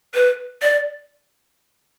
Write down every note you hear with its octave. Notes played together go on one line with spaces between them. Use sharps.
B4
D5